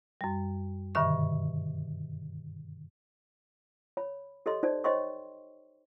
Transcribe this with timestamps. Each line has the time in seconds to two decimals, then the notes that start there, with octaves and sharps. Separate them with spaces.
0.21 F#2 G3
0.95 G2 B2 D3 D#3 E5 C#6
3.97 C#5 B5
4.46 G4 A4 C#5 D#5 C6
4.63 D#4 C5 D5
4.84 C5 C#5 D#5 G5 C6 C#6